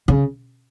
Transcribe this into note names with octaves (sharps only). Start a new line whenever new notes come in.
C#3